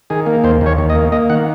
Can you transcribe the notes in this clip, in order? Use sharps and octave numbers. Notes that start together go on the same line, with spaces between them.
D#3 G#4
A#3
D#2 C5
D#2
C#5
D#2
D#5
A#3
A#3 D#5
D#3 F#5